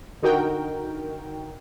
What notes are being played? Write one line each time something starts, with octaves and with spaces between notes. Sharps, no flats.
D3 D#4 F#4 A#4 G5